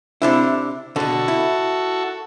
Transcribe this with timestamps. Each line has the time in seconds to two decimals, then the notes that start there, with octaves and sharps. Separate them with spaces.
0.22 C3 D4 E4
0.96 B2 D3 F#4 A4
1.28 E4